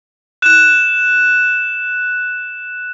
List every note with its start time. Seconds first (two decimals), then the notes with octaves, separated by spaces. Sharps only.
0.42 F#6 E7